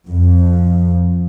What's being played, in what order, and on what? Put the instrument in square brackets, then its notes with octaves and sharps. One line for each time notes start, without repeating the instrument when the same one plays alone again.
[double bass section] F2